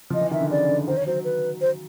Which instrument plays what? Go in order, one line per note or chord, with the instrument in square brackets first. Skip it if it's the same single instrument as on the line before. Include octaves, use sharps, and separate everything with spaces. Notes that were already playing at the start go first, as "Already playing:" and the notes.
[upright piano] F3 [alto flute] D#5
[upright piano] E3
[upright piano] D#3 [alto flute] E5
[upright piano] D3
[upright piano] C#3 [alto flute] D5
[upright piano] D3
[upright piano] D#3 [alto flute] C5
[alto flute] C#5
[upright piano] F#3 [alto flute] C5
[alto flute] B4
C5